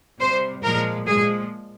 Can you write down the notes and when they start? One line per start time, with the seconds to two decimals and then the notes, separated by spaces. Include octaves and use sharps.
0.19 C3 G3 C5
0.63 A#2 F3 G#3 A#4
1.07 A#2 F3 G#3 G#4